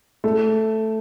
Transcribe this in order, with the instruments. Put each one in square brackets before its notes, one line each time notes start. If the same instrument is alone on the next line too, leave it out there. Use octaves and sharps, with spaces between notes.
[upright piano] A3